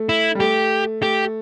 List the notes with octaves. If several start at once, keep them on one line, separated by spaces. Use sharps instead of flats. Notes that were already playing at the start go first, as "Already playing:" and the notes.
Already playing: A3
E4
G3
A3 G4
A3 G4